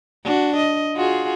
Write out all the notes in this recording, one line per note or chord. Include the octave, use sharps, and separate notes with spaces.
D4 F#4
D#5
F4 F#4 G#4